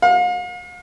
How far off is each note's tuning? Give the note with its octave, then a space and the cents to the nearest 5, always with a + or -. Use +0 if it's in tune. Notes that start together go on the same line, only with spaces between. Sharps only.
F5 +45